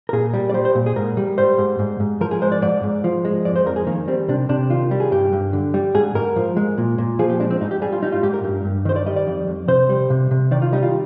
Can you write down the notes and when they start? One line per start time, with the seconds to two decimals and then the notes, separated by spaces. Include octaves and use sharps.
0.09 A#4
0.13 A#2 G#4
0.34 G3
0.50 D5
0.54 G3 C5
0.65 C5
0.75 A#2
0.86 G#4
0.96 G#2 A#4
1.17 G3
1.38 G3 C5
1.58 G#2
1.79 G#2
2.00 G#2
2.21 F3 A#4
2.31 G#4
2.42 G#3 C5
2.52 D5
2.62 G#2 D5
2.83 G#2
3.04 F3
3.25 G#3
3.45 F2 D5
3.56 C5
3.66 F2 A#4
3.76 G#4
3.87 D#3 A#3
4.08 G3 C4
4.29 C3 D4
4.49 C3 D4
4.70 D#3 F4
4.91 G3
5.00 G#4
5.12 G2 G4
5.33 G2
5.53 D3
5.74 G3
5.94 G#2 G#4
6.15 G#2 A#4
6.36 F3
6.57 G#3
6.78 A#2
6.98 A#2
7.19 F3 G#4
7.30 G4
7.40 G#3 D4
7.51 C4
7.61 G#2 D#4
7.71 G4
7.82 G3 G#4
7.92 F4
8.02 G3 D#4
8.12 F4
8.23 G#2 G4
8.34 A#4
8.44 G2
8.65 G2
8.85 D#3 C5
8.96 D5
9.06 G3 D#5
9.16 D5
9.27 F2
9.48 F2
9.68 C3 C5
9.89 G3
10.10 C3
10.31 C3
10.51 D#3 D5
10.62 F4
10.73 G3 D#4
10.82 F4